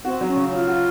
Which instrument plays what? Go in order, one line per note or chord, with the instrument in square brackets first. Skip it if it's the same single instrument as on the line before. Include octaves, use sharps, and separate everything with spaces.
[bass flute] C4 [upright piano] F#4
[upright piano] F#3
[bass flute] C#4
[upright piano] C#3
[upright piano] C#4 [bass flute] F4
[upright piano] F#4